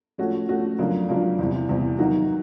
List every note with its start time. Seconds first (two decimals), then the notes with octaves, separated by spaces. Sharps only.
0.18 F3 A3 C#4 F#4
0.48 F3 A3 C#4 F#4
0.79 F2 C#3 F#3 A#3 D4
1.09 F2 C#3 F#3 A#3 D4
1.39 E2 C3 E3 G3
1.69 E2 C3 E3 G3
1.99 D#3 F#3 A#3 D#4 F#4